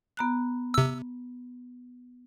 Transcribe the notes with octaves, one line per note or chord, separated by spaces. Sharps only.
B3 A#5 F#6
C3 E6